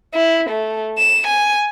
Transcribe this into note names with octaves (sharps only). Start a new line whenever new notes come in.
E4
A3
E7
G#5